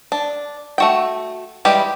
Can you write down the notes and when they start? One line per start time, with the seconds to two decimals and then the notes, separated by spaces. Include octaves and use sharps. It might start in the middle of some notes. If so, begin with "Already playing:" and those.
0.12 D4
0.78 A3 F#4 G5
1.65 E3 G3 G#3 G4